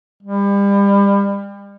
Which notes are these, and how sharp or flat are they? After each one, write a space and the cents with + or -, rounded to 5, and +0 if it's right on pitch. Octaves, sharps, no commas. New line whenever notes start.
G3 +35